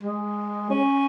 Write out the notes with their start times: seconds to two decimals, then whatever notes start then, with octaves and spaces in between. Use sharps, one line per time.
0.03 G#3
0.70 C#4